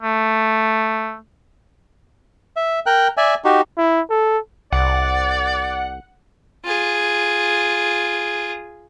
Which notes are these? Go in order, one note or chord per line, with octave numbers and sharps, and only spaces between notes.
A3
E5
A#4 G5 F#6
D5 E5 G#5
D#4 F#4 G4
E4
A4
C2 D5 F#5
F4 G#4